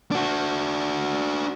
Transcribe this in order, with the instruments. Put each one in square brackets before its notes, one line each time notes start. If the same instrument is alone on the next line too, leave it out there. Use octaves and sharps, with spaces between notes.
[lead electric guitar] D4 F#4